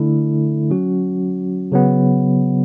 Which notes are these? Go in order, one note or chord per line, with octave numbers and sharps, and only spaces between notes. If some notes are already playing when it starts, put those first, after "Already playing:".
Already playing: D3 A3 E4
F#3 C#4 F#4
C#3 F#3 B3